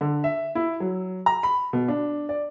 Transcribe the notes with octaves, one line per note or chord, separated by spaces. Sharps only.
D3
E5
E4
F#3
A#5
B5
B2
D4
D5